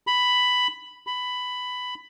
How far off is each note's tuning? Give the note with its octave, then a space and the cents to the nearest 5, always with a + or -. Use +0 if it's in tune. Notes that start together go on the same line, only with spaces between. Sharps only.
B5 +5
B5 +10